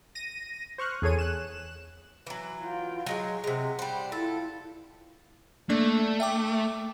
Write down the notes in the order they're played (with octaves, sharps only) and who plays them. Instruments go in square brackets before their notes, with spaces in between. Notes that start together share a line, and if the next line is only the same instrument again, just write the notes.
[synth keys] A#6 D#7
C5 C#6 F6 F#6
E2 G#4 A4 C#5 D#7
F#6 E7
[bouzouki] E3 F#3
[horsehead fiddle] F4 G5
[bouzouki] F#3 G#3 C#5
[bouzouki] C3 G#3 [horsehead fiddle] F#5
[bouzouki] G3 C5
[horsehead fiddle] E4 F4 [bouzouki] A4
[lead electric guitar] A3 [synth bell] A#3 D4 D5
[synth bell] E5 G5 D6